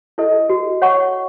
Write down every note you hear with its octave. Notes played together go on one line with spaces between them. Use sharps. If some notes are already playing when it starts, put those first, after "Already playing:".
E4 A4 D#5
F#4
C#5 F#5 C#6